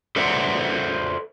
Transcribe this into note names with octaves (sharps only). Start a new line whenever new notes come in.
A4 B4 C5 D5 E5 F#5